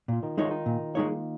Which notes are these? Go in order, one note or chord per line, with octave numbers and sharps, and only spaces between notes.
A#2 F4
D#3 D#4
G#3 D#4 C#5
F4
D#3 D#4
A#2
G#3 A#3 D#4 C#5